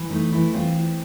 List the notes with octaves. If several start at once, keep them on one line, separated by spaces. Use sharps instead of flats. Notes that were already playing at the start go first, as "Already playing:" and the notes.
Already playing: E3
A3 D#4
E3 E4
C4 F4